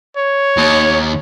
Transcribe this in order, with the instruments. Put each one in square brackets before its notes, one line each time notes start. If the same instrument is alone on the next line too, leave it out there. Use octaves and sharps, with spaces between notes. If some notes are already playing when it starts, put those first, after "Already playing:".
[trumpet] C#5
[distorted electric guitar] D#2